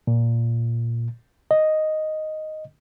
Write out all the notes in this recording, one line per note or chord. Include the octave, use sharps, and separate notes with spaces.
A#2
D#5